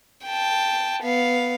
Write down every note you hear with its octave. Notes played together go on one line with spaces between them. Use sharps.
G5 A5
B3 F5